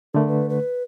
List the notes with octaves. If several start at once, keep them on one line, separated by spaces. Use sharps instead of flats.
D3 A3 A#4
B4
B4